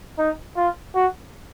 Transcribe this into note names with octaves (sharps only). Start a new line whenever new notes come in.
D#4
F4
F#4